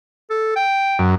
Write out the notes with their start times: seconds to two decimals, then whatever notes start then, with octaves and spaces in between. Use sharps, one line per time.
0.30 A4
0.56 G5
0.99 F#2